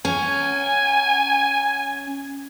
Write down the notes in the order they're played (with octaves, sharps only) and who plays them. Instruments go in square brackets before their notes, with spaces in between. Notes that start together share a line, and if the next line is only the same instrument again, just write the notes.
[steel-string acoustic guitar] C#4 [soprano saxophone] G#5